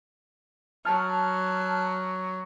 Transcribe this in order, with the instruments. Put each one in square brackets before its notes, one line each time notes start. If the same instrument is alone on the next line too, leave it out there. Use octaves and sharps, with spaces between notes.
[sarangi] F#3 [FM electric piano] A5 F6